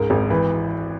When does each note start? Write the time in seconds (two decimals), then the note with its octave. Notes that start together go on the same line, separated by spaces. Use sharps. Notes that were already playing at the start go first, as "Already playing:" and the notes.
Already playing: C#2 G#2 A#4
0.10 G#1
0.30 E3 B4